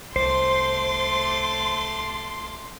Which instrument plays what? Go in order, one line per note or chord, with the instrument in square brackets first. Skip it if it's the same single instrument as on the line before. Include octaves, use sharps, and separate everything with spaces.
[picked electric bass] C2 [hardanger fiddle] A3 D6 [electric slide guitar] C5 [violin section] C6